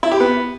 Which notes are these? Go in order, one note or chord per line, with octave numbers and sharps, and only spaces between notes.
E4
G4
B3